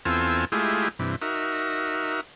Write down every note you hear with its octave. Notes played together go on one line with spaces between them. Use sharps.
E2 C4 F4 A4 G#5 E6
G#3 A3 E4 F4 G4 G#4
G2 C3 E3
D#4 F#4 A#4 E5